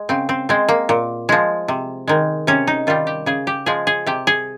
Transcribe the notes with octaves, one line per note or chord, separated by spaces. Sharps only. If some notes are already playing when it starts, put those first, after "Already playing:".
Already playing: G#3
C#3 C4
C4
G#3 C4
A#3
A#2
F3 G#3
C3
D#3 G#3
C3 C#4
D#4
D#3 G3 F4
G4
C#3 G#4
G4
F3 G#3 G#4
G#4
C3 G4
G#4